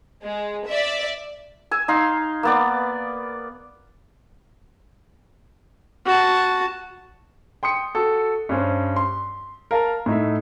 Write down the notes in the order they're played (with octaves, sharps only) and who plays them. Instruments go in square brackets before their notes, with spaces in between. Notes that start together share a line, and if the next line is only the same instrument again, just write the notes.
[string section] G#3
D5 E5
[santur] G#5 E6
D#4 F5 C6
A#3 B3 D5
[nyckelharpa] F#4 A5
[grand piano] G5 C6 D#6 C#7
F#4 A4
G2 C#4 C5
C6
A#4 F5 A5
A2 D#4 E5